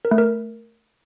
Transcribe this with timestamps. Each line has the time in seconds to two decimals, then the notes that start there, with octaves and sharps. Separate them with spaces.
0.05 A#4
0.11 A3
0.18 A#4